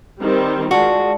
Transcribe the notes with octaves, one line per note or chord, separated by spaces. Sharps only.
D#3 G3 C4
G#3 F4 F#4 D5 A5